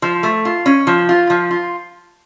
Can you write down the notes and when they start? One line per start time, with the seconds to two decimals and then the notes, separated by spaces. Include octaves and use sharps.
0.02 F3
0.23 A3
0.45 F4
0.66 C#4
0.87 F3
1.09 F4
1.30 F3
1.51 F4